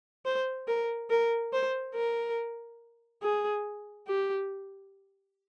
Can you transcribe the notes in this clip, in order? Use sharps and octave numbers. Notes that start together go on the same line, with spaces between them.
C5
A#4
A#4
C5
A#4
G#4
G4